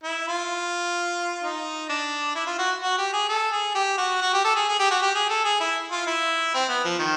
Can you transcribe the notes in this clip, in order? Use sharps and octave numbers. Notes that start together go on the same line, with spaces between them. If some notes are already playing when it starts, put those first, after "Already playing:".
E4
F4
D#4
D4
E4
F4
F#4
F#4
G4
G#4
A4
G#4
G4
F#4
F#4
G4
A4
G#4
G#4
G4
F#4
G4
G#4
A4
G#4
E4
F4
E4
C4
B3
F3
D#3